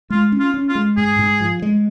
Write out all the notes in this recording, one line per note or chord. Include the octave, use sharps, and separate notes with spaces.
G#3 F4
C#4
F4
C#4
F4
G#3
G#2 G#4
G#2
F3
G#3